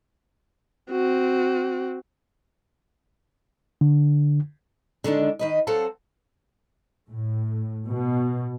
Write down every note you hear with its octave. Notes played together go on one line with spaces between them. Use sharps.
C4 F#4
D3
D3 D#3 G#3 D4
D#3 B4 D#5
F#3 C4 A4 F5 F#5 A5
A2
B2